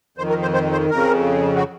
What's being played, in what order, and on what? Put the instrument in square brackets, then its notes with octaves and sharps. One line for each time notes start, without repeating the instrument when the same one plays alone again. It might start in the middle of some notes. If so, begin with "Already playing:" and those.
[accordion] F2 D#3 C5
A#4
C5
C5
C5
F2 C#3 A#4
F#4